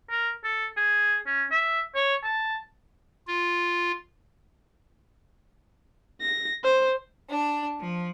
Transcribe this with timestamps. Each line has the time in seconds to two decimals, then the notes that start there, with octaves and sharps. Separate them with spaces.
0.10 A#4
0.44 A4
0.77 G#4
1.26 C#4
1.51 E5
1.95 C#5
2.23 A5
3.27 F4
6.21 A#6
6.64 C5
7.30 D4
7.80 F3